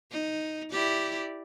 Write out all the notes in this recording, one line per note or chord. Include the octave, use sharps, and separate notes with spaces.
D#4
E4 G4 D5